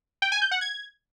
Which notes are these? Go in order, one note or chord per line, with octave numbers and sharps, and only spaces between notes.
G5
G#5
G6
F#5
G#6